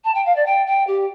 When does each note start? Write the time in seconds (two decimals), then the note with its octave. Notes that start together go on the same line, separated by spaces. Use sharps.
0.05 A5
0.15 G5
0.26 F5
0.36 D5
0.46 G5
0.67 G5
0.87 G4